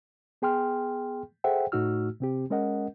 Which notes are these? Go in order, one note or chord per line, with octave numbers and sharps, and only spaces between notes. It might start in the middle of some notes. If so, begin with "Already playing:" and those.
B3 G#4 G5 C6 F6
G#4 A4 C5 E5 F#5 G5
A2 A3 D#4 F#4 E6 F6
C3 C4 G4
G#3 C#4 A#4 D#5 F#5